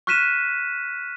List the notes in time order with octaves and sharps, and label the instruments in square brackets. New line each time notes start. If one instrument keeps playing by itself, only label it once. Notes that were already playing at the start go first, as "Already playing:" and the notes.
[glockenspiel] C#6 F6 F#6 B6 D#7 E7